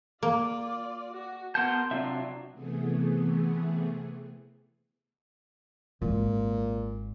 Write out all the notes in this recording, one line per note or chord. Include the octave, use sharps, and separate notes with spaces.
A#3 F4 D5
F#4
B3 A#4 F#5 A5 C6 G6
C3 F#3 D4 F4 E5
C3 E3 A3 B3 G#4
G#1 A#2